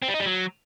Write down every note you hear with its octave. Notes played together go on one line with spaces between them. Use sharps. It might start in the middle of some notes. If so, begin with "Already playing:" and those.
C4
G3
D#4
G3
F#3